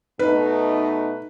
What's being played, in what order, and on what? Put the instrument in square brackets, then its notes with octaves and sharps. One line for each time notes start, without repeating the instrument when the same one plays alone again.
[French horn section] B2 A3 D#4 [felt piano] B4